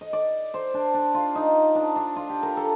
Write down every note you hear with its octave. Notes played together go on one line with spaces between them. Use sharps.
D#5
D5
C5
D4
D4
F4
D#4
D4
D4
F4
G4
A#4
A4